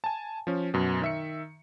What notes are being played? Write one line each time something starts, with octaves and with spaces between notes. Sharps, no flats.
G#5 A5
F3 C#4
F#2 B2
D#3 E5 C#7